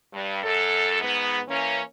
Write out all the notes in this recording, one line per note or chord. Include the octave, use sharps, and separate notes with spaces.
G2
F#2 A4
G#2 B3
E3 A#3 C#4